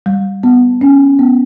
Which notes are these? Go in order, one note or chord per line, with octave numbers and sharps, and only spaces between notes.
G3
B3
C#4
B3